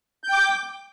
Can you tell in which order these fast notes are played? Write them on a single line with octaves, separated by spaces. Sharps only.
G6 G5 D6